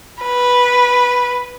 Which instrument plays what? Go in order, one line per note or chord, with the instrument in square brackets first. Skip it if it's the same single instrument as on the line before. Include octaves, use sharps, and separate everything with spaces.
[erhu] B4